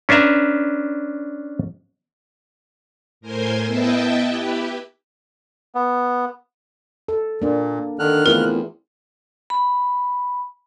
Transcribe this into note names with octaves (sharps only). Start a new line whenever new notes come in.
C#4 D4 B4 E5 A#5
A2 A#4 C5 G#5 C6
B3 E4 D#5 E5 G5 A5
E4 G4 B4
B3
A4
A#2 A#3 D4
D3 D#3 F6 F#6
E2 A3 C4 F4 A#4
B5